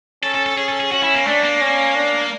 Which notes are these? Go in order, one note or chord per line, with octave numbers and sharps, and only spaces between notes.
C#4 A4
A4
A4
C#4 G#4
A4
G#4
C#4 F#4
E4
A#3
A3 D4
A#3
C#4
D4